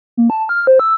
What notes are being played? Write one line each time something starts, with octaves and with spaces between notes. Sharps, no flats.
A#3
A5
F6
C5
E6